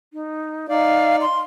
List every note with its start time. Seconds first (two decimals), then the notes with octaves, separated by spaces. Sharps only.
0.13 D#4
0.69 D#4 D5 F5
1.21 C6